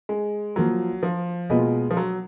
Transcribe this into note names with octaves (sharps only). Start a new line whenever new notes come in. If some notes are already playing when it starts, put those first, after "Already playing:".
G#3
F3 F#3 A#3 F4
F3
B2 G#3 A#3 F4 B4 D#5
F3
F#3